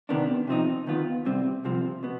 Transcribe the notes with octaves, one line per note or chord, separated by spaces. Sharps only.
C3 D#3 B3 D4
C3 F3 C4 D#4
D#2 D#3 B3 F4
C2 C3 G3 C4
C2 C3 F3 C4
B2 B3